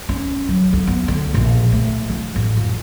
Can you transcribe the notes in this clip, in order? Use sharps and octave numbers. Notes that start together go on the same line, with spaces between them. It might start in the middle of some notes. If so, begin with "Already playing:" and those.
C#4
F#3
D2
B3
D2
A#1
A3
F3
A1
F2